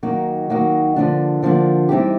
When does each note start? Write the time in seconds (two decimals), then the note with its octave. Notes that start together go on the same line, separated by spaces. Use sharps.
0.03 D#3 F#3 A#3 D#4 F#4
0.50 D#3 F#3 A#3 D#4 F#4
0.96 D3 F3 A#3 D4
1.42 D3 F3 A#3 D4
1.89 E3 G3 C4 D#4 G4